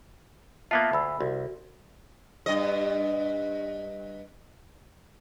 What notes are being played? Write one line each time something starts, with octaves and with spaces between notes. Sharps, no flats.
A#3 B3 F4 E5 F5 A5
D2 B5 E6
C2 F#4
G2 D#5